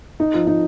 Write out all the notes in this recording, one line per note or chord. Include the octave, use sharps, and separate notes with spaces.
D#4
F3
D#4